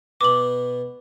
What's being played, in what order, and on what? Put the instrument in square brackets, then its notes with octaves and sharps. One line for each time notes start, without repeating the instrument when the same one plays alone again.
[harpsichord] B2 B3 [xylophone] D6 F#7